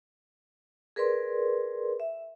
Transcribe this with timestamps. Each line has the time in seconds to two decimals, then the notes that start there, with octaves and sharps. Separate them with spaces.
0.96 G#4 A#4 B4 D5 C6
2.00 E5